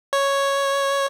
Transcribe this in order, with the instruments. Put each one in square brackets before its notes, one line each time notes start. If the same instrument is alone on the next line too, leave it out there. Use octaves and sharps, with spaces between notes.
[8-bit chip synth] C#5